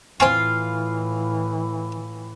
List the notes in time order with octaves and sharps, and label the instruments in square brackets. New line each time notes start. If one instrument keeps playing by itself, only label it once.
[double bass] A2 E3 [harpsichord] C4 G#5 C#6 [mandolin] F4 F5